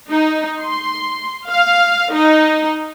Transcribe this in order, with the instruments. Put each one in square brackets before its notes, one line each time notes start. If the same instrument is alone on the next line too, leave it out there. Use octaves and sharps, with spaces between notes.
[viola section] D#4
C6
F5
D#4